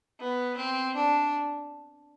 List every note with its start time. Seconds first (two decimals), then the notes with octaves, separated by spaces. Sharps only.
0.20 B3
0.57 C4
0.95 D4